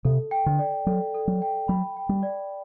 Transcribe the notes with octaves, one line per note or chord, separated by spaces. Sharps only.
C3 A4
G5
D3
D5
F#3 A4
A4
F#3
G5
F#3 B5
G5
G3
D5